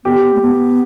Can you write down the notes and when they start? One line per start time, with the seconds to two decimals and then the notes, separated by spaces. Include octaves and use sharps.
0.05 B3 G4
0.34 A3
0.41 B3